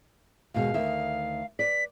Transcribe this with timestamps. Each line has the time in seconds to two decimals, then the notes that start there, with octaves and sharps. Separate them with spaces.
0.54 D#2 B2 G#3 F5
0.74 D2 D#3 E5
1.59 B4 D5 B6